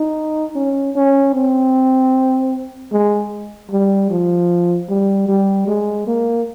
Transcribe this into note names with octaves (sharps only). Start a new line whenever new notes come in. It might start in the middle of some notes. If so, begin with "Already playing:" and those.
Already playing: D#4
C#4
C#4
C4
G#3
G3
F3
G3
G3
G#3
A#3